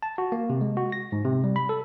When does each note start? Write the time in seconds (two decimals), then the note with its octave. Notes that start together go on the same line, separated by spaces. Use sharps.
0.03 A5
0.18 F#4
0.32 A#3
0.50 C3
0.61 G#3
0.77 F#4
0.92 A#6
1.12 G#2
1.25 C3
1.44 G3
1.56 B5
1.69 A4